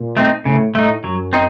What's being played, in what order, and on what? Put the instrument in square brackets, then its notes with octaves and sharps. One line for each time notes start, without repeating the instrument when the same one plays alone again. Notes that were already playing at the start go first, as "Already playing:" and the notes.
Already playing: [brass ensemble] A#2
[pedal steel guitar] A3 C4 D#4
[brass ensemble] A2 [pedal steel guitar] C#3
[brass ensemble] A2 [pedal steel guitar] A3 D#4
[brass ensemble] F#2 [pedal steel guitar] F#3
[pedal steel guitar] C4 D#4